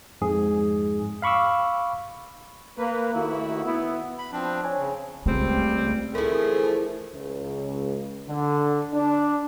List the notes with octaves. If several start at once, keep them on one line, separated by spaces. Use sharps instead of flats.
F2 G#2 G#4
F5 B5 C#6 D6 E6
A#3 B4
D#2 D#3 A3 E4 F#4
B3 E4
B5
F3 C4 D4
C#5 G#5
C#3
C#2 G3 A3 C4
D3 E3 F3 A3 E4 G#4 A#4
C#2
D3
D4